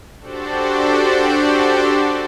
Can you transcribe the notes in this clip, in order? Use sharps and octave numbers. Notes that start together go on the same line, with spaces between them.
D4 F#4 G4 A4 C5 D5